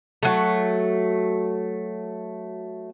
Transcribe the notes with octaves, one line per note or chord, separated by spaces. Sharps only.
F#3 A3